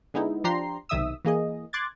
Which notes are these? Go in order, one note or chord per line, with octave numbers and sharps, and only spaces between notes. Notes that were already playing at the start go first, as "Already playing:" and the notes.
D3 G#3 B3 D#4 E4
F3 D4 G4 A#5 C6 C7
B1 C3 D#3 E5 D#6 E6
E3 A#3 G#4 D#5
C6 D6 F#6 G#6 A6